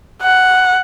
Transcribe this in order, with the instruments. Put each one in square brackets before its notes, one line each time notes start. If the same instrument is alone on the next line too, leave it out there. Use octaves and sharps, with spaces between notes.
[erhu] F#5